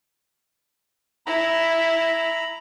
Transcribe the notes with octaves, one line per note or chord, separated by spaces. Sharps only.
E4 A#5 B5